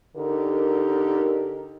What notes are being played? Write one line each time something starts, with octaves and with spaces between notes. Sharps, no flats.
D3 D#4 G4 A#4